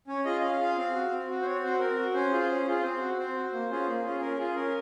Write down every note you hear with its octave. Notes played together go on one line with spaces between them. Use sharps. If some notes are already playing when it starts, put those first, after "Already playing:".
C#4 C#5
F4 G#4 D#5
C#4 F5
F4 G#4
C4
F#4
C4
F#4
C5
C4 C#5
F#4 C5
C4 A#4
F#4
C#4 C5
F4 G#4
C#4
F4 G#4
C4 C5
F#4
C4 C5
F#4
A#3
C#4 F4 G#4
A#3
C#4 F4 G#4
C#4 A#4
F4 G#4
C#4 A#4